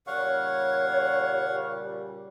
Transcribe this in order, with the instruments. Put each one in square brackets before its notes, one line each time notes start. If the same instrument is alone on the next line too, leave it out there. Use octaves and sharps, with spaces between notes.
[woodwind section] A#2 C#3 G3 [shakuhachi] C#5 [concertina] F5 F#5 C#6